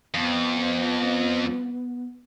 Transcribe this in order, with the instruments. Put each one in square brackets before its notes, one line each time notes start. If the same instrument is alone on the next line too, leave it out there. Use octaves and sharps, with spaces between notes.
[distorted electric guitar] F2 [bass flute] B3